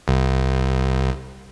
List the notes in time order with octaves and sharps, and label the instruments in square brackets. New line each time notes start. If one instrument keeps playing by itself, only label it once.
[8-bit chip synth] C2